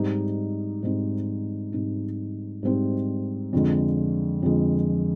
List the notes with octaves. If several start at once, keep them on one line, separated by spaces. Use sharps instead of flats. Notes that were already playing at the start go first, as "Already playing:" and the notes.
Already playing: G#2 G3 C4 D#4
G#2 G3 C4 D#4
G#2 G3 C4 D#4
G#2 G3 C4 D#4
F2 D3 G#3
F2 D3 G#3